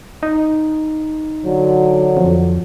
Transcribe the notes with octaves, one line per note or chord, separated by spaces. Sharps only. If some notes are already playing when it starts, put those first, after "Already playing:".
D#4
D3 F#3
F2